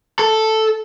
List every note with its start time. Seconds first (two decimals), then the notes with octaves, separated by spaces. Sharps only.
0.19 A4